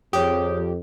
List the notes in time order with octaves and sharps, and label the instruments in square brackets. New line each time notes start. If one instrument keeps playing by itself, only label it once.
[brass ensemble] F2 [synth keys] G4 [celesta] G#4 C#5 D#6